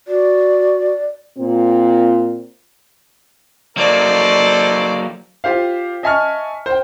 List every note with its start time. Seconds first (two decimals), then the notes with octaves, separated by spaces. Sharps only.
0.08 F#4 D5
1.38 A#2 C4
3.77 F#3 A#3 D#4 A4 C5 D5
5.44 F4 G4 C5 F5
6.03 D#5 E5 G#5 A5 C#6 F6
6.66 C5 G5